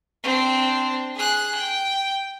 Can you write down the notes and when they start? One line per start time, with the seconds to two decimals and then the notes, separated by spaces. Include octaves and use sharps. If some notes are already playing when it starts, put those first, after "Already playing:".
0.23 C4 D4
1.15 G#4 F#6
1.55 G5